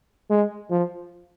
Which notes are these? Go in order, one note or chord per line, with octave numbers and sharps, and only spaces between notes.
G#3
F3